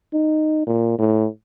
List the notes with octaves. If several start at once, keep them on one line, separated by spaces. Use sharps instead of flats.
D#4
A#2
A2